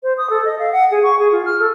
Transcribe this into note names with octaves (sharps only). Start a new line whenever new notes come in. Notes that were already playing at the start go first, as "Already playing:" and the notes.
C5
D#6
A4
D#5
F5
F#5
G#4
C#6
G#4
F4
F6
A4